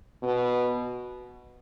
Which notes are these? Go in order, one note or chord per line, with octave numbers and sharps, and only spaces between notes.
B2